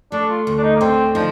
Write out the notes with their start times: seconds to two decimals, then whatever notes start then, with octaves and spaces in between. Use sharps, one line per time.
0.12 A3 D4
0.30 F4
0.47 D2
0.58 D4
0.63 D#4
0.76 A#3
0.81 D3 C4
1.15 F3 D#4